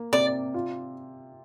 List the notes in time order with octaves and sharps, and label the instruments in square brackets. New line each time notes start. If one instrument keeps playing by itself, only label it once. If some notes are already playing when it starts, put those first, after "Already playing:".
Already playing: [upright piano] A#3
[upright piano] C3 [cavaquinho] D5
[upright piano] F4